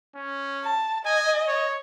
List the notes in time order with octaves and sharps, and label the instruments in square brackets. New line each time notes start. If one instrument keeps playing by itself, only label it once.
[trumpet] C#4
[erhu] A5
[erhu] D#5 [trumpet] G#5
[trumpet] C#5